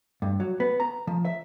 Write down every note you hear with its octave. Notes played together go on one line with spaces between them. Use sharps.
G2
F#3
B3
A#5
F3
E5